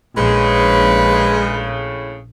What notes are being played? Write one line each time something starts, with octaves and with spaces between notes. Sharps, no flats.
A#1 A2 C#3 G#3 B4